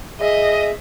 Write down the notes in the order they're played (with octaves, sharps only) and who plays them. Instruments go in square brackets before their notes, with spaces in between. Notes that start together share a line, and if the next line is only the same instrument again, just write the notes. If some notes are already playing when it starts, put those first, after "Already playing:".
[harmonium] G#4 E5 [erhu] D#5